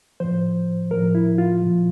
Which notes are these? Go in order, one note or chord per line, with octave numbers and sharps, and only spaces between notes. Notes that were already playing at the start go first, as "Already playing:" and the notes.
A2 F3 C5
A2 F3 A#4
E4
F4
A#2 F3